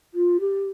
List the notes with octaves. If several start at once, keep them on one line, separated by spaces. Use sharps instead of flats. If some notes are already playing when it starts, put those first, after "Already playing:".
F4
G4